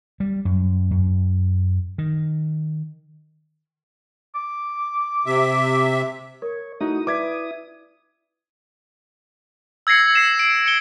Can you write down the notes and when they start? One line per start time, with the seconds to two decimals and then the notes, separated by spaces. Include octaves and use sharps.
0.20 G3
0.45 F#2
0.91 F#2
1.98 D#3
4.35 D6
5.26 C3 E5
6.42 A#4 C#5
6.80 A3 D#4 E4 F#4 D#6
7.07 B4 D5 E5 D6 G#6 B6
9.87 E6 G#6 A#6 C7 C#7
10.15 C7 E7
10.39 D7
10.66 C#7 G7